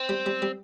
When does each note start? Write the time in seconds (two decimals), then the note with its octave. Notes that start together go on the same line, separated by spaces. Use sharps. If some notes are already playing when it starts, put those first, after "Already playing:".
Already playing: C4
0.09 G3
0.26 G3
0.42 G3